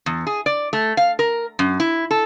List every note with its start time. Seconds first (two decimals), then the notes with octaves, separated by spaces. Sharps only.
0.06 E2
0.27 G#4
0.46 D5
0.73 A3
0.97 F5
1.19 A#4
1.59 F#2
1.80 E4
2.11 A4